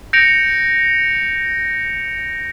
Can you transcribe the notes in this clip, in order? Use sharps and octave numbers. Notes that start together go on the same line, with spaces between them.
G6 A#6 C#7 D7 F7